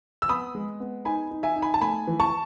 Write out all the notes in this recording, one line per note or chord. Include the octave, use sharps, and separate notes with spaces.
E6
B3 B5 D#6
G#3
B3
D#4 G#5 B5
D#4
E5 G#5
D#4
G#5 B5
A5
A3 G#5 B5
E3
A5 C#6